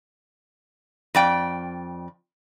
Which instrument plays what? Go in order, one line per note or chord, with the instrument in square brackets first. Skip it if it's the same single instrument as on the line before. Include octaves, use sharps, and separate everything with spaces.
[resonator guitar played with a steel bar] F2 D5 G5